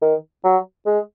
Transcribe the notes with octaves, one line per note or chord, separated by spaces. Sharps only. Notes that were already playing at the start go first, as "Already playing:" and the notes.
D#3
F#3
G#3